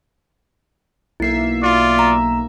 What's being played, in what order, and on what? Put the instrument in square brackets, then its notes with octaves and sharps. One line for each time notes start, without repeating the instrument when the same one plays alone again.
[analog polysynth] B1 A#3 E5 [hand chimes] E4 C7
[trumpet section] F4 D5
[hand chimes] A#5